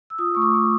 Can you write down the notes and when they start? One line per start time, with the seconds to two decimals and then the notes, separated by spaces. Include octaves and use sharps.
0.10 E6
0.19 F4 D#6
0.35 A3 C#6
0.42 D6
0.54 A3